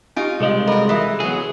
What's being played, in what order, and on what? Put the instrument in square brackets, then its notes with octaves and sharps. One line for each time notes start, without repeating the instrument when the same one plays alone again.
[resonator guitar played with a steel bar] D#4 F4 [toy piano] G4 G#5
[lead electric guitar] C2 G#3 [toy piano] G#4 D#5 F5
[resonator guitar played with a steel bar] F#4 A#4 [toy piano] A4 D#5 B5
[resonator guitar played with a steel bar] E3 [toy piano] E5 D#6
[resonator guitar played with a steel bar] F#3 [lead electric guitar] B3 G#4